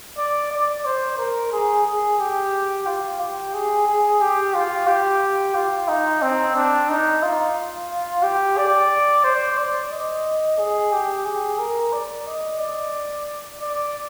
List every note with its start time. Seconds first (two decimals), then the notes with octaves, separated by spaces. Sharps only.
0.18 D5
0.51 D5
0.85 C5
1.18 A#4
1.52 G#4
1.86 G#4
2.20 G4
2.86 F4
3.20 G4
3.54 G#4
3.88 G#4
4.21 G4
4.54 F4
4.87 G4
5.55 F4
5.88 D#4
6.22 C4
6.55 D4
6.89 D#4
7.23 F4
8.23 G4
8.58 D5
9.24 C5
9.58 D5
9.92 D#5
10.58 G#4
10.92 G4
11.26 G#4
11.59 A#4
11.93 D5
12.27 D#5
12.60 D5
13.61 D5